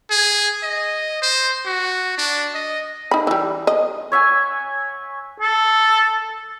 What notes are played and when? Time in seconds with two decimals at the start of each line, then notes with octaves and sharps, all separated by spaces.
0.10 G#4
0.63 D#5
1.22 C5
1.66 F#4
2.18 D4
2.55 D#5
3.11 D#4 B5
3.27 E3 G3
3.67 D#5
4.12 C#5 E5 F#5 G#5
5.40 A4